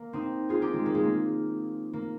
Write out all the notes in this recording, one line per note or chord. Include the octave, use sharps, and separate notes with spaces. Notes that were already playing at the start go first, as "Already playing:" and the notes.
Already playing: A#3
C4 D#4
F4 G#4
D#4 G4
G#3
A#3
G#3
A#3
A#3